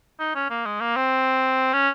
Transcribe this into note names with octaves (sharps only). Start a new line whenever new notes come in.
D#4
C#4
A#3
G#3
A#3
C4
C#4